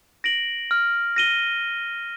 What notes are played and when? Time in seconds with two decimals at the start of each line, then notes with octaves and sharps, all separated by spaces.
0.24 A#6 D7 F#7
0.71 F6
1.16 A#6 D#7 G7